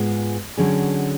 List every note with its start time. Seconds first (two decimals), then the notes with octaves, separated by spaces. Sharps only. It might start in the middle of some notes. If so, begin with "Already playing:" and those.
Already playing: G#2 G#3 B3 F4 G#4
0.57 D3 F#3 C#4 G#4